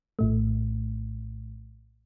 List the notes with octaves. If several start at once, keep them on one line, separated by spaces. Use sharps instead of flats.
A#1 A2 A3